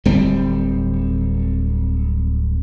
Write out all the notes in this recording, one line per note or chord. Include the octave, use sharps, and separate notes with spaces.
D1 G3 C4